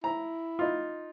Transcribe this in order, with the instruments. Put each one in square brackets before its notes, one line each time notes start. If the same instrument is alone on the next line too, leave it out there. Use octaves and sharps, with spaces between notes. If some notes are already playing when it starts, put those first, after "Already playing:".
[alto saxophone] E4 [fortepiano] A#5
[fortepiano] D#4 F4